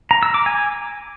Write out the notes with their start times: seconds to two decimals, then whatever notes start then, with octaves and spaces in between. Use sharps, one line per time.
0.11 A#5
0.23 E6
0.34 D6
0.46 G#5